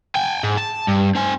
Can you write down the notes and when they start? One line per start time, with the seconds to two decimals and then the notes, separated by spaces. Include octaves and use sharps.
0.15 G5 G#5
0.43 G#2
0.58 A5
0.88 G2
1.16 C4 G#5